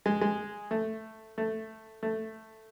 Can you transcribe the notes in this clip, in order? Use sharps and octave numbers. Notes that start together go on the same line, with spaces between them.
G#3
G#3
A3
A3
A3